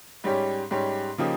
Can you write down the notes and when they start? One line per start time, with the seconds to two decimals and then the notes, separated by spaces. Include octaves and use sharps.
0.24 G#2 G3 C#4 G4 C#5
0.71 G#2 G3 C#4 G4 C#5
1.18 C#3 F3 A#3 D#4 G4